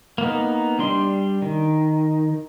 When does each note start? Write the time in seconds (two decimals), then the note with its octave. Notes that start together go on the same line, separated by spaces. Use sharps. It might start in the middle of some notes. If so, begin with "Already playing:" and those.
0.18 A#3 B3 D#4
0.79 G3 D4 C6
1.42 D#3